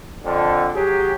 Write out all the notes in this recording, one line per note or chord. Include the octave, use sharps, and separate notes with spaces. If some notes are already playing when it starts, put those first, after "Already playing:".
F2 D3
F#3 G4 G#4